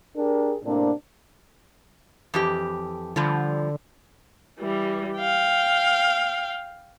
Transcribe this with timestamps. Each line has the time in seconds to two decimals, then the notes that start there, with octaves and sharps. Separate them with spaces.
0.16 D4 G4 G#4 A#4
0.63 A2 C3 A#3 C4 D4
2.34 F2 E3 G4
3.16 D3 F3 G3
4.59 E3 G3
5.18 F5 G5